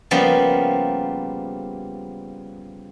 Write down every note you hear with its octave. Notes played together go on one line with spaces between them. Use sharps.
C#3 F3 G3 A#3 B3